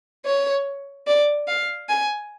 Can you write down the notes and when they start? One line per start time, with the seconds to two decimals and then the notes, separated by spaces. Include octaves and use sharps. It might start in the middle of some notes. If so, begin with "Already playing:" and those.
0.25 C#5
1.07 D5
1.48 F5
1.88 G#5